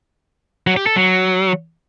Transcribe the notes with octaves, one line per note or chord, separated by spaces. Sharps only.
F#3
G4
A4
F#3